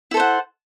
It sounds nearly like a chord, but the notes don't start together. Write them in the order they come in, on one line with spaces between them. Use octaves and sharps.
E4 A4 C5 F#5